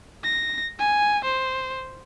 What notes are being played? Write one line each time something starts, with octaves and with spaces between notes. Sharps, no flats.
A#6
G#5
C5